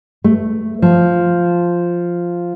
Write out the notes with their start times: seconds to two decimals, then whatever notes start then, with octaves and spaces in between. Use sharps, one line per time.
0.24 A3
0.82 F3